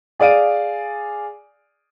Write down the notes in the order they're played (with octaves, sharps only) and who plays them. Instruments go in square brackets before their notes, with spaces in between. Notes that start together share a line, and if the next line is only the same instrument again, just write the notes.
[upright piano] G#4 D5 F5 D7 D#7